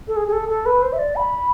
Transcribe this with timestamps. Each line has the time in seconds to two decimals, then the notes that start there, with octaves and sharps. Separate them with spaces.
0.08 A4
0.16 G#4
0.28 G#4
0.32 A4
0.49 A4
0.66 B4
0.82 C5
0.93 E5
0.98 D5
1.16 B5